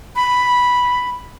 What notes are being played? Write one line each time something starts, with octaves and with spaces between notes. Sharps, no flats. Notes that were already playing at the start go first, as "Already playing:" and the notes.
B5